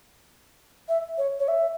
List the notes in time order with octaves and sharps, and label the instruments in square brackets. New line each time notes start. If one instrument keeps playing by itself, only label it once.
[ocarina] E5
C#5
C#5
E5